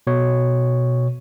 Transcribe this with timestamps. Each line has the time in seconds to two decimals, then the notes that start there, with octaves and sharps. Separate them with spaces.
0.07 B2 C#5